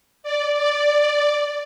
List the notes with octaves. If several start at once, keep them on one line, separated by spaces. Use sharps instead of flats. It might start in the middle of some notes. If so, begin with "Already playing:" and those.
D5
D5